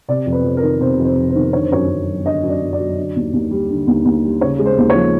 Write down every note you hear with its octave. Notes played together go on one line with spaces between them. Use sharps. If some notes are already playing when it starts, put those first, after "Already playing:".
C3 D5
F2
B4
F2
A#4
D#3
C3 C5
F2
C5
F2
C5
D#3
D3 C#5
C5
F#2 C#5
F#2
F#3
D3 D#5
F#2
D5
F#2
D5
F#3
D3
D#2
D#2
G3
D3
D#2
D#2
G3
C#3 C#5
G#3
C5
D#2
C#5
F3